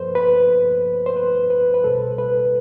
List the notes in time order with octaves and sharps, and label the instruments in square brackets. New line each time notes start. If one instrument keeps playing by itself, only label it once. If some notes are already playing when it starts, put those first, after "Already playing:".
Already playing: [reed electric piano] G2 F3 A4 B4 C5
B4
C5
B4
B4
B4
C2 B2 G3 A4
B4